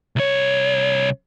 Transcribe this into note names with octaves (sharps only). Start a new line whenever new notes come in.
C2 C#5